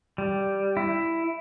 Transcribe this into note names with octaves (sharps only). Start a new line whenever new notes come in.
G3
E4